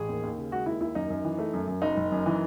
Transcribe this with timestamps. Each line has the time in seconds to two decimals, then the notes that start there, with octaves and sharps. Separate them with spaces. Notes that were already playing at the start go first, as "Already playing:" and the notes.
Already playing: A1 G#4
0.09 D#2
0.23 D#2
0.38 C#3
0.52 G#3 F#4
0.66 D#2 E4
0.80 D#2 E4
0.95 F#2 D#4
1.10 F#2
1.25 E3
1.39 A3
1.53 F#2
1.68 F#2
1.82 F#1 D#4
1.97 F#1
2.12 F#2
2.26 E3